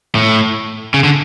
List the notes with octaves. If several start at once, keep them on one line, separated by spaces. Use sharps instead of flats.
A2
C#3
D3